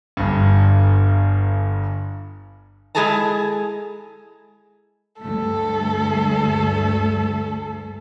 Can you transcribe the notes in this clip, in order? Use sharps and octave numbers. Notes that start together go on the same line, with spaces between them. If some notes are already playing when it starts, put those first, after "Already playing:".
G1 G2
G#3 E4 G#4 A4 A5 A#5
D2 G2 A3 A4